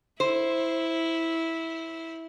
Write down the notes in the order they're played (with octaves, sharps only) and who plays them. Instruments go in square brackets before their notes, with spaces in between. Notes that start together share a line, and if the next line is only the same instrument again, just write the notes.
[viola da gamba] E4 [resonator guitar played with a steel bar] C5